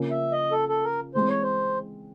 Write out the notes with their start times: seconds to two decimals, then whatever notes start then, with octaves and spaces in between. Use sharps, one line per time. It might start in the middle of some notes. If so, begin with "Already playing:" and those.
Already playing: C#3 F3 A#3 C#4
0.11 E5
0.32 D#5
0.52 A4
0.69 A4
0.84 A#4
1.15 E3 G#3 C4 C5
1.29 C#5
1.42 C5